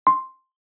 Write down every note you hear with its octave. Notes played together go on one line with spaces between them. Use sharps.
C6